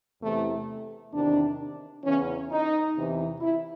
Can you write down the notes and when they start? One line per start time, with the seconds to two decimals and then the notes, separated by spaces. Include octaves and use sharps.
0.20 E2 C3 E3 A3
1.11 E2 C3 D#3 D4
2.02 E2 C#3 E3 C#4
2.48 D#4
2.93 E2 C3 E3
3.38 E4